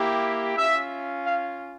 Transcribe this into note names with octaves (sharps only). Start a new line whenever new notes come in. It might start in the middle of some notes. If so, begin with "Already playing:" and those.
Already playing: A#3 E4 G4
C#4 F4 E5
F5